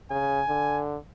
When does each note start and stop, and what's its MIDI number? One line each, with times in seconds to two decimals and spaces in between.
0.11 0.41 49
0.11 0.81 80
0.49 0.97 50